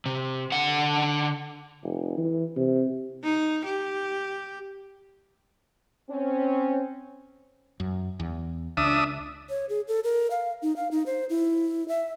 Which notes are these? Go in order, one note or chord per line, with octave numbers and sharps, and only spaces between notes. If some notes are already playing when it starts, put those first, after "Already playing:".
C3
D3 F#5
F1
E3
C3
D#4
G4
C4 C#4
F#2
E2
C#2 D4 E5 D#6
C#5
G#4
A4
A#4
F5
D#4
F5
D#4
C5
E4
E5